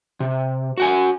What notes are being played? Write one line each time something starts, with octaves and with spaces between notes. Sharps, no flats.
C3
F#4 F#5 G#5